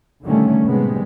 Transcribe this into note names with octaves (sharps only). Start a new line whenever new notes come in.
B2 D3 D#3 G3 A3 C#4
A2 C3 D#3 G3 G#3 B3